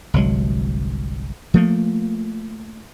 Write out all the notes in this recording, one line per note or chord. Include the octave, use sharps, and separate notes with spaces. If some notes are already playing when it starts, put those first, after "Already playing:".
G1 C2 F#3 G#3
F3 A3 A#3